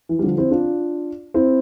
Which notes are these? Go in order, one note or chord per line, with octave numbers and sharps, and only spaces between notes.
E3
G3
D3 F3
C4 E4
D4 F4
C4 E4